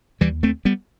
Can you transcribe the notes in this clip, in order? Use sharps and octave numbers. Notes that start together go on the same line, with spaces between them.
D#2 E3 G3
A3 C4
G3 B3